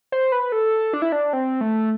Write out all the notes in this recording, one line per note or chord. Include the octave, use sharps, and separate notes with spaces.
C5
B4
A4
D4
E4
D4
C4
A3